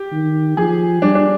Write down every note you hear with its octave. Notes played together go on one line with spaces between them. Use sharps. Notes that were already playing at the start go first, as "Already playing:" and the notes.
Already playing: G4
D#3
F3 G#4
G3 D4
D4